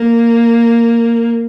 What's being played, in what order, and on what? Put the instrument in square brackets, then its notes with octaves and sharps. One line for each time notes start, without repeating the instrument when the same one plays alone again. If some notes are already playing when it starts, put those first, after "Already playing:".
Already playing: [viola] A#3